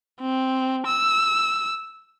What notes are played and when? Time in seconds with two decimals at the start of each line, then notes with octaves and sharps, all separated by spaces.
0.21 C4
0.86 E6